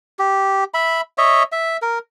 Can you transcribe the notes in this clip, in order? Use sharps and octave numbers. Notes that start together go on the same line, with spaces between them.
G4
E5 B5
C#5 D#5 E5
E5
A#4